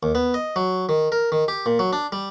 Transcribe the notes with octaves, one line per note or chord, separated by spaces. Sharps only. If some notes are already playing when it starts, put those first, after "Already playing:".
D#2
B3
D#5
F#3
D#3
A#4
D#3
G4
A#2
F#3
D4
G3